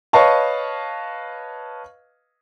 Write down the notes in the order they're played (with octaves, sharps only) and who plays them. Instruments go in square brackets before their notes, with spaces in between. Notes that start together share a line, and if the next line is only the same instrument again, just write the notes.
[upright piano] B4 C#5 D#5 F5 A5 C#6